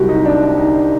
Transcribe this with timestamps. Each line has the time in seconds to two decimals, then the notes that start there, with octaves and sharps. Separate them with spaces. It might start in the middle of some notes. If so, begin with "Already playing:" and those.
Already playing: C2 C3 F#3 F#4 G4
0.09 D#4
0.25 D4
0.57 D#4
0.75 D4